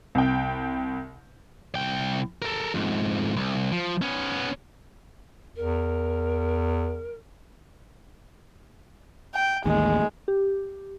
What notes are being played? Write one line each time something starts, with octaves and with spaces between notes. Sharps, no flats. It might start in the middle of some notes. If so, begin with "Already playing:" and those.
C2 G5
C2 G5
A4 A#4
F2 G#2
C2
F3
B3 C#4
E2 A#4
G5
A1 D#2 G#3
G4